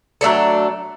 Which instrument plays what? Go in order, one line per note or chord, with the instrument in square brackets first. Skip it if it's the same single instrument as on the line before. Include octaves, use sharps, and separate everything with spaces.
[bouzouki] F#3 A3 D4 A4